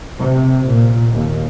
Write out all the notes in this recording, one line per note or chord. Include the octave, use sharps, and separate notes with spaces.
C3
A#2
D#2